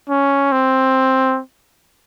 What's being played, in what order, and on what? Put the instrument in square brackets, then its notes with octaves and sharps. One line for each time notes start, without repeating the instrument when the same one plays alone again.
[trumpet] C#4
C4